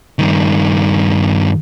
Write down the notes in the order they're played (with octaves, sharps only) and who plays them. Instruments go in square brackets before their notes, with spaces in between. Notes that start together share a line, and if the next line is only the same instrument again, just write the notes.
[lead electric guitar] G2 D#3